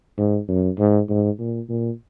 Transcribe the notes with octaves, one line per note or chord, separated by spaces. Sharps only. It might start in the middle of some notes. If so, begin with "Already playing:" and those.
G#2
F#2
G#2
G#2
A#2
A#2